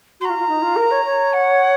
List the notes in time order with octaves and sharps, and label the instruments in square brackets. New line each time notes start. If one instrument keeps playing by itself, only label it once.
[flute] F#4 [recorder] C6
[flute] F4 [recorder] A#5
[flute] F4
D#4
F4
A#4
C#5
C#5
[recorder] F#5